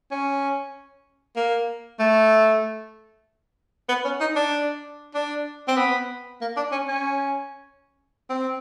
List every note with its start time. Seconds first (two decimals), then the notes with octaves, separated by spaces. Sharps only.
0.11 C#4
1.36 A#3
2.00 A3
3.89 B3
4.04 C#4
4.20 D#4
4.36 D4
5.15 D4
5.68 C4
5.77 B3
6.41 A#3
6.57 D4
6.72 C#4
6.88 C#4
8.29 C4